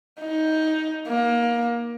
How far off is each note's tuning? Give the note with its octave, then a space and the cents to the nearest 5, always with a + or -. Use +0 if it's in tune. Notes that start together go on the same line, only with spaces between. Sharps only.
D#4 +15
A#3 +20